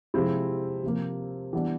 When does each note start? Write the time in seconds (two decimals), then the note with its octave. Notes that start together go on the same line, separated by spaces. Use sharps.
0.14 C3 F3 G#3 C4 E4
0.83 C3 F3 A#3
1.53 E3 G3 B3 D4